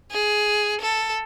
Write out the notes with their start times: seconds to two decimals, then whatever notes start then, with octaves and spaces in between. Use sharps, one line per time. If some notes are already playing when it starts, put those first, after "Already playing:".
0.11 G#4
0.81 A4